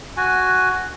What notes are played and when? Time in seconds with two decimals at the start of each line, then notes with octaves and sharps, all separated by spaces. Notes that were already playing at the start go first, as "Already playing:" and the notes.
0.17 F#4 G#5